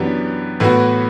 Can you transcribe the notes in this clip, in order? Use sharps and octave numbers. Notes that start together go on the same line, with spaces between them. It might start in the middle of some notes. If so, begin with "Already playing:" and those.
Already playing: F#2 E3 B3 D4 G4
A2 E3 B3 F#4